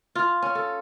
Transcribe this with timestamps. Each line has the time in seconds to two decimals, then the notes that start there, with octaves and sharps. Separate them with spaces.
0.15 F4
0.42 C#4
0.55 A4